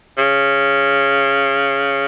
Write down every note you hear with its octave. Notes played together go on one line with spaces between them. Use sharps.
C#3